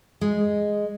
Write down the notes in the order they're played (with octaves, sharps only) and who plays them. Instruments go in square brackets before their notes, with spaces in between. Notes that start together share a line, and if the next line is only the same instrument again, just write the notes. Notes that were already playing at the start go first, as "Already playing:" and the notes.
[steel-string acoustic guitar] G#3